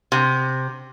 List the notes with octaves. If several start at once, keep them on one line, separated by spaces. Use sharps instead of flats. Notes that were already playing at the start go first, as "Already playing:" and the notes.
C3